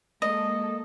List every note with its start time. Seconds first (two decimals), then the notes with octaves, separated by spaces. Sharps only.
0.22 G#3 A#3 A4 D#5